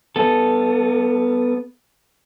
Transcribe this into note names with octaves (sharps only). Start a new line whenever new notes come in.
B3 A4